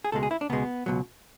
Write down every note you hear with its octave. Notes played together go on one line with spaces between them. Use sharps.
G#4
C#2 B2 G#3 A4
G#4
E4
D4
C#2 B2 G#3 B3
C#2 B2 F#3